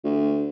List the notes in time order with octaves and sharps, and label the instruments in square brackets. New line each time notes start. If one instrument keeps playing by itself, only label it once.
[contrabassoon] D2